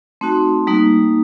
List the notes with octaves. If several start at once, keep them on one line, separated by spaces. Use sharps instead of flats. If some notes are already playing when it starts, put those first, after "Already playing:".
A3 C4 D#4 F#4
G3 A#3 D#4